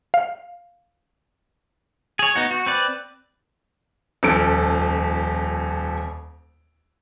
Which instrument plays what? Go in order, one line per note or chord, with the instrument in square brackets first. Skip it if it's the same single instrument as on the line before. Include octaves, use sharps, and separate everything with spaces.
[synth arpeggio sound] F5
[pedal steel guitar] G#4 C#5
B3 D#4 F#4
F#4
C4 B4 D5
[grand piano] D#1 F2 C#4 A4 D7